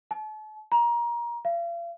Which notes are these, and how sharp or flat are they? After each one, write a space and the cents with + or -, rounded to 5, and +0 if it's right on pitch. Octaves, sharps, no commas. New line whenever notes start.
A5 -40
A#5 +25
F5 -40